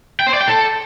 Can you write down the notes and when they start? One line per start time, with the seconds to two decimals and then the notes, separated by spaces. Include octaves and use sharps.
0.20 G5
0.27 C5
0.34 D5
0.41 G5
0.48 A4